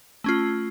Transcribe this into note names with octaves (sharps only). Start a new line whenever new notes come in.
A3 C#4 F4